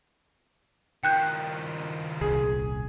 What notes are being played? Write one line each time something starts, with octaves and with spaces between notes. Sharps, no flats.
D#3 F3 G5 F#6 G6
D#1 C2 G#4